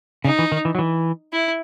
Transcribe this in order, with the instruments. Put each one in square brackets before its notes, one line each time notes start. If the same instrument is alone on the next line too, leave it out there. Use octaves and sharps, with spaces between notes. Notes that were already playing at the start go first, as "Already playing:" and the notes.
[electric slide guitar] C#3 [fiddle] D#4
[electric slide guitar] E3
D#3
E3
F#3
E3
[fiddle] E4